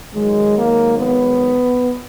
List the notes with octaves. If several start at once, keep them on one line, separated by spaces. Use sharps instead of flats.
G#2 D#3 F#3 G#3
A#3
B3